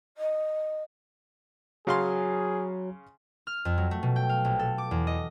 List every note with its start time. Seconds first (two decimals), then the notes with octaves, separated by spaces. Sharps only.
0.17 D#5
1.87 C#3 F#3 G#4 F5 C6
3.47 F6
3.65 F2
3.78 F#3
3.91 A3
4.03 B2
4.16 G5
4.29 F5
4.45 A#1
4.59 A4
4.78 D6
4.91 E2
5.07 D#5